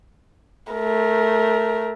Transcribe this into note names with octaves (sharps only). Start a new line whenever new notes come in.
A3 A#4